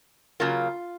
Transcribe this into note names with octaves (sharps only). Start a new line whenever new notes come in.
C#3 F#3 A#3 F4